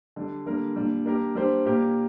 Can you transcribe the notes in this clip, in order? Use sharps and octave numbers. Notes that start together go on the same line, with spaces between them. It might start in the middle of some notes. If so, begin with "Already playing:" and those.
D3 G3 D4
D3 G3 A#3 D4 A#4
A#2 G3 D4
A#3 D4 G4 A#4
G3 A#3 D4 G4 C5
A#2 A#3 G4 A#4